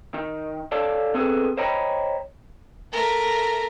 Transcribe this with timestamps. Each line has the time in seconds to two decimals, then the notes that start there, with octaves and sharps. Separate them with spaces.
0.14 D#3
0.72 G4 A4 C#5 D5 F5 A5
1.14 B3 C4 G#4 A4
1.57 C5 C#5 D#5 G5 A#5 B5
2.92 A3 A#4